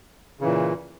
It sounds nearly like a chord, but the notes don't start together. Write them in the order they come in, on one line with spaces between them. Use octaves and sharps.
C#3 E3 A#2